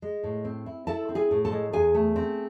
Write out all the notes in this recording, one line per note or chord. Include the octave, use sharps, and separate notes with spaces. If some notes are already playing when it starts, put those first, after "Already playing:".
G#3
A2
C4
E4
E4 A4 A5
C4
G#4 G#5
A2
A4 A5
G#3
E2 G#4 G#5
A3
C4